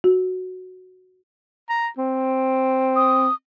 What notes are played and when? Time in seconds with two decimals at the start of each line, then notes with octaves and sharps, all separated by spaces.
0.04 F#4
1.69 A#5
1.98 C4
2.96 D#6